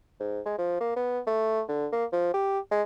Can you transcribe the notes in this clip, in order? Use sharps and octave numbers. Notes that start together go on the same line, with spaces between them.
G#2
G#3
F3
A#3
B3
A3
D3
A#3
F3
G4
G#3